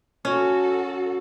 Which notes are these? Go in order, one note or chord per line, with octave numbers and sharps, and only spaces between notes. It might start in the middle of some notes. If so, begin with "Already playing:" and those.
C#4 F#4 A4